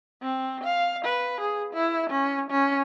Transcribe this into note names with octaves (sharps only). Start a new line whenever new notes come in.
C4
F5
B4
G#4
E4
C#4
C#4